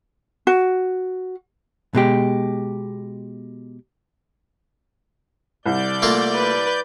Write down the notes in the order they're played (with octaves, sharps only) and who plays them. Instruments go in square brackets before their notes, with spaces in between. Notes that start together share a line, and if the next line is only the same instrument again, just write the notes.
[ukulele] F#4
[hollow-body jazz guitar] B2 G#3 G4
[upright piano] C2 [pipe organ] D5 G6
[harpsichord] A3 A#3 F4
[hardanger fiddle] B4